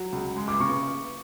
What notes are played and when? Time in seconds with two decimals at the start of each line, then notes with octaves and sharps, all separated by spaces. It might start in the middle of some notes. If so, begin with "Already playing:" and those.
Already playing: F#3
0.12 C#2
0.37 G#3
0.48 D6
0.60 C#3 C#6